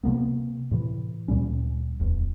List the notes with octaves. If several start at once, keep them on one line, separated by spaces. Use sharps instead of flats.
C3 E3 A#3 B3
A2 C3 E3
D2 A#2 G3 C#4
D1 E2